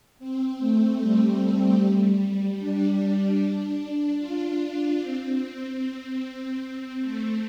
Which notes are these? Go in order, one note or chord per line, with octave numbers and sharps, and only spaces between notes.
C4
A3
G3
D4
F4
D4
C4
C4
A3